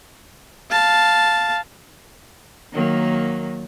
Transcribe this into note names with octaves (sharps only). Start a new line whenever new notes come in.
F5 A5
D#3 F#3 A#3